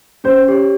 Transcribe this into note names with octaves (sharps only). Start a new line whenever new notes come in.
C#4 C5
G4 C#5